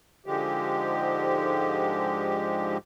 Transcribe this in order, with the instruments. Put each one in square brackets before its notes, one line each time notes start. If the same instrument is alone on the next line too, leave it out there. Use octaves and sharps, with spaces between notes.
[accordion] G#2 D3 F3 G#3 G4